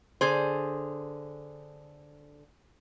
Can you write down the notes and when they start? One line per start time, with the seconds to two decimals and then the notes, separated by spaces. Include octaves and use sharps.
0.21 D3 G#4 C5